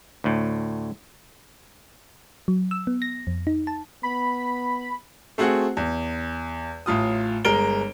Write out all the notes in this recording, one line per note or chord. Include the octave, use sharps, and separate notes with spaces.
D2 A2
F#3
E6
B3
A#6
F2
D#4
A5
B3 B5
A3 C4 F#4 G#4 F#5
E2
A1 A2 F4 D#6
G1 G#3 A#4 D7 G7